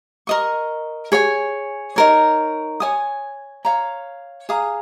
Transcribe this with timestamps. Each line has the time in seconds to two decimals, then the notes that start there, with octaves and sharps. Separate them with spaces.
0.27 A#4 D#5 C#6
1.12 G#4 C#5 G#5
1.96 D#4 A#4 C#5
2.80 C#5 G#5 D#6
3.65 C#5 F5 A#5
4.49 G#4 F5 A#5 D#6